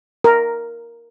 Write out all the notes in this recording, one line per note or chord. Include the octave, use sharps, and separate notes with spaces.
A#4